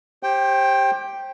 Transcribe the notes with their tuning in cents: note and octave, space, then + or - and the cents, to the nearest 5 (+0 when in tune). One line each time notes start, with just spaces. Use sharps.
G4 +0 C5 +30 G5 +0